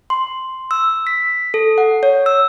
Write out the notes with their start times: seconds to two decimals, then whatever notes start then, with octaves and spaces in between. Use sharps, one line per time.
0.10 C6
0.71 E6
1.07 B6
1.54 A4
1.78 F#5
2.03 C#5
2.26 E6